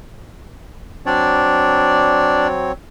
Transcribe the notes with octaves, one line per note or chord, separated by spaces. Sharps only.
F#3 C4 D4 C#5 D5